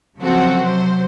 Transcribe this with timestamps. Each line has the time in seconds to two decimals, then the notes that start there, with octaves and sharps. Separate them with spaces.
0.19 C#3 F3 F#3 C4 F#4 A4
0.60 C3 F#3 C5